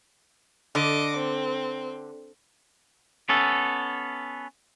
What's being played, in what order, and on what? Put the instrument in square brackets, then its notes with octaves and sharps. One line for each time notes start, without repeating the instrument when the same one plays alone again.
[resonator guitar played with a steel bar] D3 [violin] D#5 D6
[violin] C4
[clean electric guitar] B3 C#4 A4